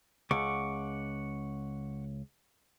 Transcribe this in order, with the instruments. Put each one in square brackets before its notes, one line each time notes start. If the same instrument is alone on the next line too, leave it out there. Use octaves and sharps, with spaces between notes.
[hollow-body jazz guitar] C#2 [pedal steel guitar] F#5 C#6 D6